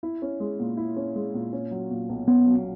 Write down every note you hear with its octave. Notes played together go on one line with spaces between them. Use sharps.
E4
C#4
G#3
A#2
E4
C#4
G#3
A#2
C#4
F#3
A#2
B1
B3 C#4
F#3